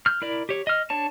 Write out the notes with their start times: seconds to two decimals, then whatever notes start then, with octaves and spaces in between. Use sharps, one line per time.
0.06 F6 G6
0.22 E4 A#4 D5
0.49 G4 C#5
0.67 D#5 F6
0.90 D4 C#5 A5